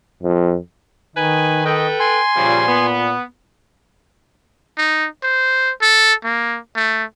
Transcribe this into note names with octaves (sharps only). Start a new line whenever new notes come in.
F2
D#3 D#4 B4 G#5
A4 B4 D#5 G5
G#5 C6
A#2 C#3 F3 G3
B3
D#4
C5
A4
A#3
A3